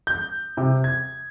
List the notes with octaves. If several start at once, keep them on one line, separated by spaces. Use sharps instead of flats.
G6
C3
G#6